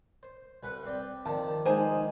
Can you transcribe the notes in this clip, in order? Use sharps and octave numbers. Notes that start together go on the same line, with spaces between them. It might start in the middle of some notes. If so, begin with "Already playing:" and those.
C5
C2 B4 F#5
C4 D5 G5
D#3 F3 D5 A5
G#3 D#4 G#4 C5 G#5